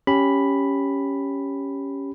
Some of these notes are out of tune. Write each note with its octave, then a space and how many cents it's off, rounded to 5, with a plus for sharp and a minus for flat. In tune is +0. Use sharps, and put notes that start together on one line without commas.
C#4 +0 G4 +0 B5 +0